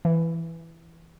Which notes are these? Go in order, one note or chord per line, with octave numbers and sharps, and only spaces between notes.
E3